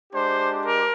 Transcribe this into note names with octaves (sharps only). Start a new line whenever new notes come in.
G#3 D4 G4 C5
A#4